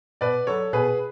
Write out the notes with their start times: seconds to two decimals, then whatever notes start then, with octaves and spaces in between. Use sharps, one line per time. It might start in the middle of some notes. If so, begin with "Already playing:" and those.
0.21 B2 B4 D5
0.47 F#3 A4 C#5
0.73 B2 G#4 B4